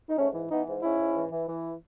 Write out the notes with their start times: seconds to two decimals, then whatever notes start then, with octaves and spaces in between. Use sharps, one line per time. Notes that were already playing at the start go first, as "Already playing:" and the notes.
0.09 D#4
0.18 G#2 A3 C#4
0.34 E3
0.51 E3 B3 D#4
0.67 G#2
0.82 G#2 C#4 E4
1.00 G#2
1.15 E3
1.32 E3
1.48 E3